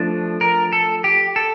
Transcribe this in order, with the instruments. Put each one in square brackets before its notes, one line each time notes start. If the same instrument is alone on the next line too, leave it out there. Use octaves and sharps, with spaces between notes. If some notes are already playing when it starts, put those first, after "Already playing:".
Already playing: [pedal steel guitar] F3 A3 D4
A#4
A4
G4
A4